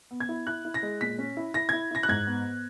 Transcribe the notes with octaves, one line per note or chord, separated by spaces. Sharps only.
B3
G#6
E4
E4 F#6
E4
A#6
G#3
A#2 B6
C#4
E4
E4 A#6
E4 G#6
E4 A#6
F#6
G#2 G#6
B3